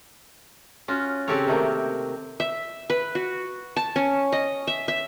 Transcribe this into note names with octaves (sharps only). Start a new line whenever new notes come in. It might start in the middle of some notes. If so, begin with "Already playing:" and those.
C#4 F4 F#4
C#3 C4 F#4 G4 A4 C#5
C3 D#3 A3 A#3
E5
B4
F#4
A5
C#4
D#5
E5
E5